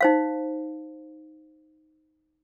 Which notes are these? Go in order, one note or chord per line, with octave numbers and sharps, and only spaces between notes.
D#4 C5 F5